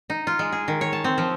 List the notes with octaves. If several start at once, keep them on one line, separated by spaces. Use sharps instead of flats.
D#4
F4
G#3
G#4
D#3
C#5
A5
C4
F3